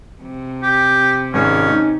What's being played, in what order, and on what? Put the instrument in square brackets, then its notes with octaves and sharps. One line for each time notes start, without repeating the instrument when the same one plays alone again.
[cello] C3
[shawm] G4
[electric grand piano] G#1 G#3 [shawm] C#4
[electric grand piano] D#4